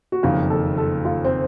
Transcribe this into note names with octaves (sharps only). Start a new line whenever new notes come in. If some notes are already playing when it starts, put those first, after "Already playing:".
F#4
F#1 F2 D#3 F4
A4
A4
F4
C4